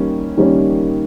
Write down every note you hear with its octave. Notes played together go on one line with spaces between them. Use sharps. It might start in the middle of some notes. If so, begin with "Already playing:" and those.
Already playing: D#3 G3 A#3 C#4
D#3 G3 A#3 C#4